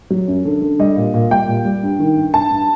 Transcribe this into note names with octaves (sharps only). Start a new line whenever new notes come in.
F#3
F#2
D3
D3
G3 D#5
A#2
A#2
G3 G5
A#2
G3
G2
D#3
G2
G2 A5
G2